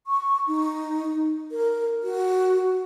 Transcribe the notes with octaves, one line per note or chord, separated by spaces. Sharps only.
C#6
D#4
A#4
F#4